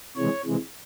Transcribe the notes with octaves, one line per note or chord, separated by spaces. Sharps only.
C3 E3 G#3 C#5
C3 E3 G#3